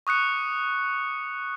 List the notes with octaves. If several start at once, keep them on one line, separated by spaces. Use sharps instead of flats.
C#6 D#6 F#6 C#7